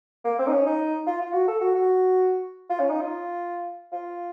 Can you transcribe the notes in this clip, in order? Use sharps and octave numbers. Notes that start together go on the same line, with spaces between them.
A#3
C4
D#4
C#4
D#4
F4
F4
F#4
A4
F#4
F#4
F4
C#4
D#4
F4
F4